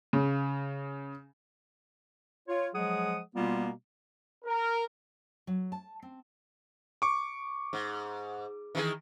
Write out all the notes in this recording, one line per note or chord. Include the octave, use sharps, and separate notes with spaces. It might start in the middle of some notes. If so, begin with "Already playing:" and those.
C#3
F4 C#5
F3 F#3 G#3 G#4 F#5 D#6
B2 G3 A#3 B3 F4
A#4
F#3
A5
C4
C#6 D6
G#2
D#3 E3 G#4